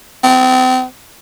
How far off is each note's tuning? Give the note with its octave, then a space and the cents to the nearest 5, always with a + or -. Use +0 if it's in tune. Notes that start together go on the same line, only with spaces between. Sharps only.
C4 -35